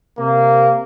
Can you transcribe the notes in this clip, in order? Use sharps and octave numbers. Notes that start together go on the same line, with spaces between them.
C3 A#3